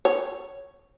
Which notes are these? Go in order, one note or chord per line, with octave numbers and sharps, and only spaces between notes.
C#5